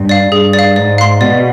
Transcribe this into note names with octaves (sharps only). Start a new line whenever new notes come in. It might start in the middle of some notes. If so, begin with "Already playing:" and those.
Already playing: G2
D5 F5
G2 G#4
D5
F5
G#2 D5
F5 C6
B2 D5